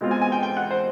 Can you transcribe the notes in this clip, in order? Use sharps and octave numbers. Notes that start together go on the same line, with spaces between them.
B2 G#3 C4 F4
G#5
G#5
G5
G5
F#5
C5